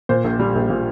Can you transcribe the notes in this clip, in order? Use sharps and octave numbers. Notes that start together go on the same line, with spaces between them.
A#2 C5
A#1
G3
A#1
A#2